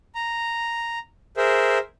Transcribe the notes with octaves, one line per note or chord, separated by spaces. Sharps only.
A#5
G#4 A#4 C5 E5